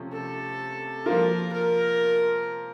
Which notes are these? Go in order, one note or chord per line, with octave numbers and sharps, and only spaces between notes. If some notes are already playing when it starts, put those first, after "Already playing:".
Already playing: C3 F3 A3 C#4
A4
F3 A#3 F4 A#4
A#4